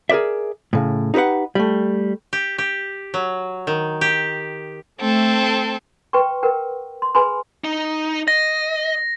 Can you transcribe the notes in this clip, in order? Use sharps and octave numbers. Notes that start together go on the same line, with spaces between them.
G#4 A#4 B4 D5 E5
A2 C#3
D#4 G4 G#4 B4 F#5
G3 A3
G4
G4
F#3
D#3
G4
A3 C4 A4
B4 G5 C6 C#6
A#4 B4 F#5 G5
C6
G#4 B4 G#5 B5 C6
D#4
D#5 A#6